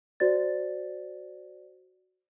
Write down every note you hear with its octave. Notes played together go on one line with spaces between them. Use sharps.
F#4 C5 D5 A6